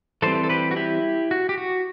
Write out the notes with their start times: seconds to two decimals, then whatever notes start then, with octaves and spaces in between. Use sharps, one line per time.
0.22 E3 G3 C4 A4 C5
0.44 A4
0.50 G4 B4
0.71 F#4
0.76 E4 G4
1.31 F#4
1.49 G4
1.58 F#4